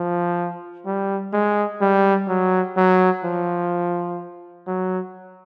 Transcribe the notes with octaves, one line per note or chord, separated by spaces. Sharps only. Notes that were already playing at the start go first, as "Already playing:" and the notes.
Already playing: F3
G3
G#3
G3
F#3
F#3
F3
F#3